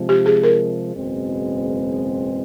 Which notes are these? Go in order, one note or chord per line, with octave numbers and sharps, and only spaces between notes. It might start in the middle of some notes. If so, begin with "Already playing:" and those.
Already playing: C3 F3 G#3
G4
G#4
A#4
F#1 E2 B2 G#3 C4